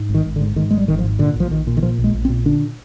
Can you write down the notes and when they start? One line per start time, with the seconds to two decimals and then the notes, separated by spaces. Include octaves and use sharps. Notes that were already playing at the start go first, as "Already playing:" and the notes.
Already playing: G#2
0.09 G#1
0.14 D#3
0.25 G#1
0.36 D3
0.40 G#2
0.56 G#2 D#3
0.71 G#1 G#3
0.78 G3
0.88 G#1 D#3
0.99 F3
1.04 G#2
1.19 A#2 D3
1.36 A#1 F3
1.51 A#1 D#3
1.67 A#2
1.77 D#3
1.83 A#2 F3
1.98 A#1
2.04 G#3
2.14 A#1
2.25 C4
2.29 A#2
2.45 D3 D4